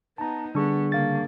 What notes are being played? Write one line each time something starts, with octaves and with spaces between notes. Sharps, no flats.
B3 D#4 A5 A#5
D3 G3 B3 D4 G#4 C#6
C#3 A#3 F5 A6